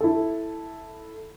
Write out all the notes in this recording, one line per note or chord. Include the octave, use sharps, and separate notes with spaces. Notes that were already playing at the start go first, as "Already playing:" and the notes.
E4 A4